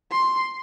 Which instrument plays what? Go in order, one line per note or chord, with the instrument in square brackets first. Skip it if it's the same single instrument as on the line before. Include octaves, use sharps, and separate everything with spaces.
[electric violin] C6